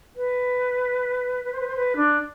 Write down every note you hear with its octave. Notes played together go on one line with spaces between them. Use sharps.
B4
B4
C5
B4
C5
B4
D4